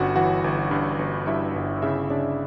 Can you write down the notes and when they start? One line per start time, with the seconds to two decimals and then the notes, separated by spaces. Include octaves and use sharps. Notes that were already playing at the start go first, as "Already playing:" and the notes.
Already playing: G1 G2 C#4 F#4 F#5
0.16 E3 F#4 F#5
0.44 G1
0.71 G2
0.99 G1
1.27 G2 E4 E5
1.56 G1
1.82 C#3 E4 E5
2.10 C#3 D4 D5